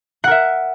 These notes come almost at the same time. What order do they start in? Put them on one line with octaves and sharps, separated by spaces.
F#5 A#4 E5